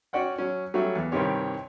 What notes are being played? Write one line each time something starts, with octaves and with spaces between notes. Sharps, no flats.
C#4 F#4 D5 F#5 G5
F#3 C#4
F#3 G3 A3 C#4 E5
E2
C2 G2 D#3 C4 G4 C#5